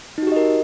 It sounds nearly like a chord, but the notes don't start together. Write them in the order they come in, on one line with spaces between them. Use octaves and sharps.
D#4 F#4 G4 D#5 A#4